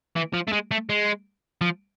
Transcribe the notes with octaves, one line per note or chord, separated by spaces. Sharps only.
E3
F3
A3
G#3
A3
G#3
F3